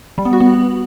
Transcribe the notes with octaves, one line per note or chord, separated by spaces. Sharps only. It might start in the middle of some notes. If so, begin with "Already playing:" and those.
G3
B3
F#4
B3